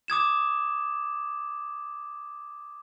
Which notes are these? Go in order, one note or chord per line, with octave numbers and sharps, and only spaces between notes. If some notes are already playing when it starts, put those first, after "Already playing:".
D6 D#6 G#6 E7